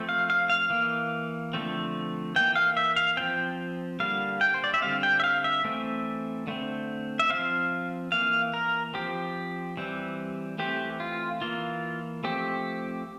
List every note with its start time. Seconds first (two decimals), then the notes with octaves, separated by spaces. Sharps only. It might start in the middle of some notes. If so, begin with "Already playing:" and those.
Already playing: F3 A3 C4
0.09 F5
0.30 F5
0.50 F5
0.70 E3 A#3
1.53 D3 F3 A3 C4
2.36 E3 A#3 G5
2.56 F5
2.77 E5
2.96 F5
3.17 F3 C4 G5
4.00 D3 G3 A#3 F5
4.41 G5
4.54 C5
4.64 D5
4.74 E5
4.82 D3 G3 C4 F5
5.03 G5
5.20 E5
5.24 F5
5.44 E5
5.65 E3 A3 C4
6.47 D3 A3 C4
7.19 E5
7.30 F3 C4 F5
8.12 E3 A#3 F5
8.54 A#4
8.94 F3 C4 G4
9.77 E3 G3 C4
10.59 E3 A3 C4 G4
11.00 F4
11.42 E3 A#3 F4
12.24 F3 A3 C4 G4